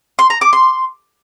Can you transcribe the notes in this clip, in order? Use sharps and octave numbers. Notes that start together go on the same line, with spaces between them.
C6
A#5
D6
C6